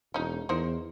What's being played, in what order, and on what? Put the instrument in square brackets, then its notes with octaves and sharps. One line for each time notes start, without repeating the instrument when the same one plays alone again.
[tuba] E1 [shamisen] C#4 D#4
[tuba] E2 [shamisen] D#4 A#4 C5